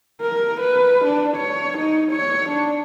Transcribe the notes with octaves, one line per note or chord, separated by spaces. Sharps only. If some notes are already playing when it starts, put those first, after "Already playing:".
A#4
B4
D4
C#5
D#4
C#5
D4